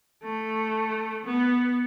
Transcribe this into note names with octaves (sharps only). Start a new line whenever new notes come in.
A3
B3